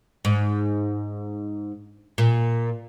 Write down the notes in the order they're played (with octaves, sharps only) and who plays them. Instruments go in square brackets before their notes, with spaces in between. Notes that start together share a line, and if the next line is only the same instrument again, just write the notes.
[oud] G#2
A#2